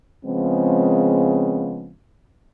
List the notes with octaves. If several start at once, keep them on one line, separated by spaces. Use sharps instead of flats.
C#3 F3 G#3 B3 C4